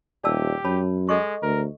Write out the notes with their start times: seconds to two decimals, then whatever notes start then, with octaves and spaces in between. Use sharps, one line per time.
0.24 D#1 G4 D5 A5 E6
0.65 F#2 C#5 A5 B5
1.09 G#3 A4 D#5 C#6
1.42 D2 A#4